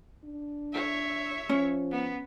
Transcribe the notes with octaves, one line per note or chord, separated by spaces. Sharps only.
D4
C#5 E5
F3 C#4
B3